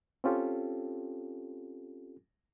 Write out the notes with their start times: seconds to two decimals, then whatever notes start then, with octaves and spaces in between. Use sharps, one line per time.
0.24 C4 C#4 F4 G4 A4